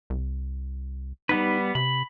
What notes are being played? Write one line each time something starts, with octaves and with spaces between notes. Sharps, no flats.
C2
G3 B3 D#4 B4
C3 B5